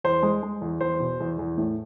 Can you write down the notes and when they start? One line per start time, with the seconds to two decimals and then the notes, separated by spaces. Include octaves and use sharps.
0.04 E2 C5
0.23 G#3
0.43 G#3
0.61 E2
0.80 E2 C5
1.00 B2
1.20 E2
1.39 E2
1.58 A2